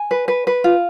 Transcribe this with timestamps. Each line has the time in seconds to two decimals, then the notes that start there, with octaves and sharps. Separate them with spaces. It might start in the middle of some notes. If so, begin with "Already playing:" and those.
Already playing: G#5
0.11 B4
0.28 B4
0.47 B4
0.64 F4